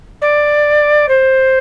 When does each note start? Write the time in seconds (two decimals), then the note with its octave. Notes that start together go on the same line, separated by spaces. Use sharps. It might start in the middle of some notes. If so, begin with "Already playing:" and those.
0.21 D5
1.08 C5